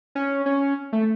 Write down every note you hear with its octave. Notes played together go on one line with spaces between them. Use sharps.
C#4
C#4
A3